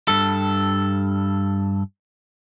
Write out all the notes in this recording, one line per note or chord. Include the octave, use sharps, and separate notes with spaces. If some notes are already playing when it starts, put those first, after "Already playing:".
G2 A4